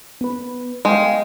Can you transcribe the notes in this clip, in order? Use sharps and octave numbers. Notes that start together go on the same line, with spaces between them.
B3 B4
G#3 F5 G5 C6